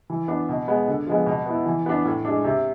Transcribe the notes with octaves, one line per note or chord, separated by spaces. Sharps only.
E3
B3 D4
B2
G#3 B3
D3
F3 G#3 B3
B2
B3 E4
E3
B3 D4
A2
G#3 D4
C3